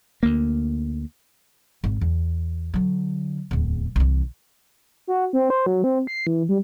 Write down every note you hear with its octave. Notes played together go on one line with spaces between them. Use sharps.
D2 A#3
G#1
E2
D3 F#3
D1 E2
C2 E3
F#4
C4
C5
F#3
C4
C7
E3
G3